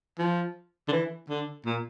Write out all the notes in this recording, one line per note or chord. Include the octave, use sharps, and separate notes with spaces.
F3
D3
E3
D3
A#2